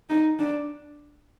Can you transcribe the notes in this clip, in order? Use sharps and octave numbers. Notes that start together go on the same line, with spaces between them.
D#4
D4